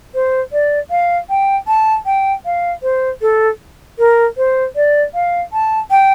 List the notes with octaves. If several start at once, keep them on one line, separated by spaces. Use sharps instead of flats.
C5
D5
F5
G5
A5
G5
F5
C5
A4
A#4
C5
D5
F5
A5
G5